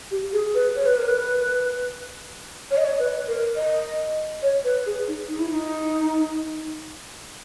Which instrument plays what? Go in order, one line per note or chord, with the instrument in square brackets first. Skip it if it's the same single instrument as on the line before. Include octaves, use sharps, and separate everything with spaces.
[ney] G4
G#4
B4
C#5
B4
A#4
B4
C#5
D#5
C#5
B4
A#4
D#5
C#5
B4
G#4
D#4
D#4
E4
D#4